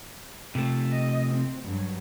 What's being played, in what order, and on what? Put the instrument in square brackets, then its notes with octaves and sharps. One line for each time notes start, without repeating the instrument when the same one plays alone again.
[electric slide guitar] C3 A3
[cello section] D#5
C4
G2 F#3